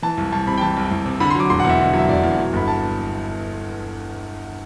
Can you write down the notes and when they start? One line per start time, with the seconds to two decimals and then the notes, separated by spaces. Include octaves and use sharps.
0.02 E3 A5
0.17 C2
0.32 C2 A5
0.47 C3 B5
0.58 G5
0.61 E3 A5
0.77 C2
0.91 C2
1.06 C3
1.20 D3 B5
1.30 C6
1.35 F#3 D6
1.50 E1 C6
1.60 F#5
1.65 E2 E5
1.79 D3
1.94 F#3 E5
2.09 E1 D5
2.24 E2
2.38 F#3
2.53 G1 B5
2.68 A5